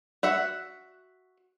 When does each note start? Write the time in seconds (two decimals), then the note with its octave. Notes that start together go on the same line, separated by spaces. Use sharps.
0.23 F#4 E5 F#5